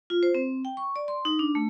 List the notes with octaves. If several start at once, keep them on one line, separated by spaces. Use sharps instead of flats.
F4
C5
C4
G5
C#6
D5
C6
D#4
D4
A3